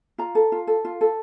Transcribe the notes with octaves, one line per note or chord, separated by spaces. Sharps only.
F4 A#5
A4
F4
A4
F4
A4